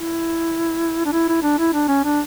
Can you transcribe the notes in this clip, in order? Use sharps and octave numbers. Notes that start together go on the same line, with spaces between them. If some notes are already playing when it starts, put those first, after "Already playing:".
Already playing: E4
D4
E4
E4
D4
E4
D4
C#4
D4